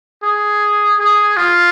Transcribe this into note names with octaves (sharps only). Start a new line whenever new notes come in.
G#4
G#4
F4